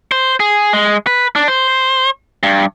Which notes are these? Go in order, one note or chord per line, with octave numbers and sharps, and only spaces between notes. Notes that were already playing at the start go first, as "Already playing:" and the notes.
C5
G#4
G#3
B4
D4
C5
G2